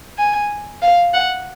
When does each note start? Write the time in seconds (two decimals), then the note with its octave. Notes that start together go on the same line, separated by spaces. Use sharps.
0.18 G#5
0.82 F5
1.14 F#5